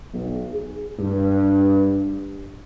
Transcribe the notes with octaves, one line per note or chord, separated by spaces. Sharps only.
B1
G#4
G2